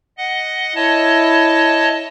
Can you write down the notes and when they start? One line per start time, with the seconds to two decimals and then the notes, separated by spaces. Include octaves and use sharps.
0.18 D#5 F#5
0.76 E4 C#5 D#5 A5